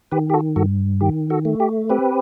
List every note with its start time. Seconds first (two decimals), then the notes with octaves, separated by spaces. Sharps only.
0.12 D#3 G4 B4
0.30 G4
0.34 F#4 A4
0.56 G2 F#4 A4
1.01 D#3 G4
1.30 F#4 A4
1.45 A3
1.60 G4
1.89 C4 G4 B4